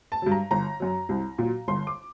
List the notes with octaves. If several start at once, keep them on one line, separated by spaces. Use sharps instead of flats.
A5
G2 F#3
A#5
G1 A#5
F#2 F#3
C2
A#2 F#3
G1 C6
D6